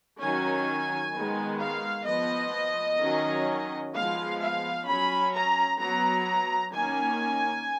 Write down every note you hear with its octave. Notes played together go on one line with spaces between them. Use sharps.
D#3 F#3 C#4 G#5
D#3 G#3 B3
F5
F3 B3 D#5
D#3 F#3 C#4
F3 G#3 B3 F5
F5
F#3 C#4 B5
A#5
F#3 B3 A#5
D#3 A#3 C#4 G#5